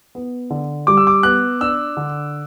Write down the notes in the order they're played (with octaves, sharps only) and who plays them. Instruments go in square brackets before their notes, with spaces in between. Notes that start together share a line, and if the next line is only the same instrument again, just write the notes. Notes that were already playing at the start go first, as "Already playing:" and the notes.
[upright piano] B3
D3
[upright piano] G3 [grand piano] D6
[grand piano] E6
D6
[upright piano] B3 [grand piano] F#6
[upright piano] D4 [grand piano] E6
[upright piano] D3